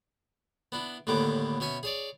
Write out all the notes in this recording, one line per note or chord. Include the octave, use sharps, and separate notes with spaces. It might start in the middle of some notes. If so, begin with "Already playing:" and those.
B3 D4 E4
D#2 A2 D3 E3 B3 D6
B2 C#4 E5 G#5 C#6
G#4 C#5 D5